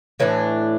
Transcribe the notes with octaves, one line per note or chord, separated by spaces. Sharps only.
A2 E3 A3 D4